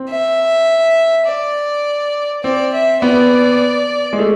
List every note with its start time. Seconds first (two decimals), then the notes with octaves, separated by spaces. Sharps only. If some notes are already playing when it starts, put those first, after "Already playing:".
Already playing: C4
0.10 E5
1.27 D5
2.43 C4 D5
2.74 E5
3.02 B3 D5
4.13 G#3
4.19 A3